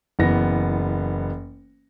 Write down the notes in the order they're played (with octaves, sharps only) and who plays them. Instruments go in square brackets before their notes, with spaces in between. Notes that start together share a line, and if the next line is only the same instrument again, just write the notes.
[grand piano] F#1 E3 B3 A#6